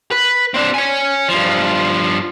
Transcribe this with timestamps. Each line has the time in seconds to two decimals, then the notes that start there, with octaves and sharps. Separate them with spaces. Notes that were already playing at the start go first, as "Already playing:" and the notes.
0.11 B4
0.54 C4 D4
0.74 C#5 G#5
1.28 G2 F3